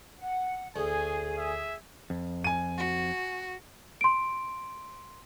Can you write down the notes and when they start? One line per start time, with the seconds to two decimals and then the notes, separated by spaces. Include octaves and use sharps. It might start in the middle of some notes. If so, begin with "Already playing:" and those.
0.19 F#5
0.76 D2 A3 G#4 G#5
1.38 E5
2.10 F2
2.44 G#5 D#7
2.77 F#4
4.01 C6 D7